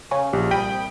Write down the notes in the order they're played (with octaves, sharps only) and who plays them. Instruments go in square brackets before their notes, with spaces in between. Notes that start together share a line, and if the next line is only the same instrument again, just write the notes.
[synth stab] C#3 [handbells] C#5 G#5 C#6
[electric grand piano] A#1 [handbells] G4
[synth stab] C2 B5 D#6 [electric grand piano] G5